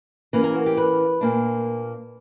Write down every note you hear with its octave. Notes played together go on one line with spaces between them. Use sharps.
E3 A#3 C#4 B4
A#4
F#4
G4
B4
A#2 A#3 D4